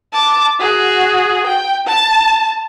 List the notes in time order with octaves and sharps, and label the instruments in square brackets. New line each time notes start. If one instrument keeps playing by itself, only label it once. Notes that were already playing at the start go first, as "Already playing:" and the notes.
[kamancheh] A5 D6
F#4 G#4
G5
A5